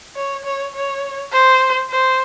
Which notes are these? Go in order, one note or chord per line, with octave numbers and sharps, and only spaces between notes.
C#5
C#5
C#5
C5
C5